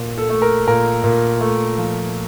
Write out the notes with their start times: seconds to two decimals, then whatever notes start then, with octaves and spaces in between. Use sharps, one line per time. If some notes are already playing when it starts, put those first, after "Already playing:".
Already playing: A#2
0.18 A4
0.30 A3
0.42 A#4
0.67 A#2 A#4
1.04 A#2
1.41 A3
1.78 F3